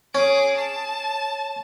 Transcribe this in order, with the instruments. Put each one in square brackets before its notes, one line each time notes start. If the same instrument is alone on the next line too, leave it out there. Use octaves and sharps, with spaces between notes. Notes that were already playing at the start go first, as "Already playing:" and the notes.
[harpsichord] C#4 [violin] G#4 D6
[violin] A5